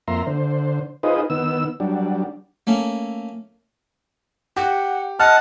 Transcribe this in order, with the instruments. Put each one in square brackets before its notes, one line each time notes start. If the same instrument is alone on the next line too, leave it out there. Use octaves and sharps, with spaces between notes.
[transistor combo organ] F2 A#3 E5 A#5 C6
D3 C5
D#4 F4 G#4 B4 C5 D#5
D#3 B3 E6
F#3 G3 D4
[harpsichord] A3 A#3 C#4
[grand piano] G4 [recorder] F#5
[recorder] D#5 [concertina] F#5 A5 [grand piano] F6